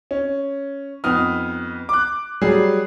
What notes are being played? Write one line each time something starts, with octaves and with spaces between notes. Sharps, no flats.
C#4
F2 B3 D#4 D#6 F6
D6 F#6
F#3 G3 G#4